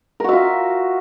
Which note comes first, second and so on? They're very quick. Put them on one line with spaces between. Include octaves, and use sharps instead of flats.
A#4 F#4 E5 F4